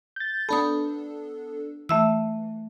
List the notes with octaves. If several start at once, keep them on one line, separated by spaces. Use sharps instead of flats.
G6 A6
B3 D4 A4 B5 D#6
E3 A3 E5 E6